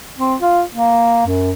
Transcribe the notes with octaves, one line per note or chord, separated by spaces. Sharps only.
C4
F4
A#3
F#2